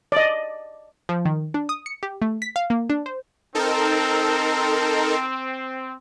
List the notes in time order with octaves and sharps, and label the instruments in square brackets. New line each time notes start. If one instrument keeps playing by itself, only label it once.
[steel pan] D5 D#5
[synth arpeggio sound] F3
D#3
D4
D#6
C#7
G4
A3
B6
F5
A#3
D4
C5
[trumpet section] C4 [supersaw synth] D#4 A4 A#4